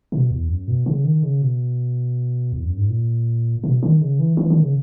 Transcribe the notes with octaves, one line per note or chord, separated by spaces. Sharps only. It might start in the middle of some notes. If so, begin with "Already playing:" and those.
B2
E2
F#2
B2
C#3
D#3
C#3
B2
E2
F#2
G#2
A#2
B2
D#3
C#3
E3
E3
D#3
C#3